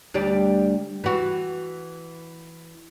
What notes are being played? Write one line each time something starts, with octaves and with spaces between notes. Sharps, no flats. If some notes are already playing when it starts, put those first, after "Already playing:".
D2 G3 D5
E3 F#4